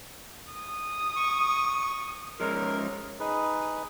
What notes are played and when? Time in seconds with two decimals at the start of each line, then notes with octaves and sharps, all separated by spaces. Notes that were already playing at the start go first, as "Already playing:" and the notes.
0.53 D#6
1.16 C#6
2.40 F3 G#3 C#4 A#4
3.20 D#4 G#4 B4